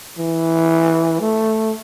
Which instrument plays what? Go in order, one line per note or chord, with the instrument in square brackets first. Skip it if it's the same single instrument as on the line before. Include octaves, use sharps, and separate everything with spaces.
[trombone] E3
A3